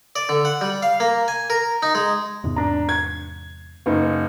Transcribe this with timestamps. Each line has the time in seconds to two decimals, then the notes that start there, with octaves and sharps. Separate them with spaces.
0.16 D5
0.29 D3
0.45 F#5
0.61 G3
0.83 F5
1.00 A#3
1.28 G#5
1.50 A#4
1.82 D#4
1.95 G#3
2.44 E2 G#2 C3
2.56 D4 A#5
2.89 G#6
3.86 F#1 D#4